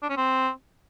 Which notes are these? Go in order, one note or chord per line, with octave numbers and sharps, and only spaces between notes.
D4
C#4
C4